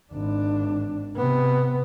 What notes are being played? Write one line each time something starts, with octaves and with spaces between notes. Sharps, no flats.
G#1 D4
C3 B3